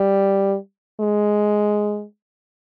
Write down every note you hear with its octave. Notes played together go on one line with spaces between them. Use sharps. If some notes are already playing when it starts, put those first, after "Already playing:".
Already playing: G3
G#3